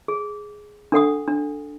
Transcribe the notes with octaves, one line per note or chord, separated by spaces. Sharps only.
G#4
D4 A4 F#5 D#6
D4